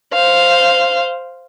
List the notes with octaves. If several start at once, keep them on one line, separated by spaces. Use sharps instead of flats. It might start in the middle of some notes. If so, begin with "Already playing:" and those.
C5 F5